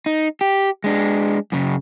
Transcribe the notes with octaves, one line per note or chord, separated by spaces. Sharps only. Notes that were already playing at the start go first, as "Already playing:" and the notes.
D#4
G4
G#3 D4
F#2 C#3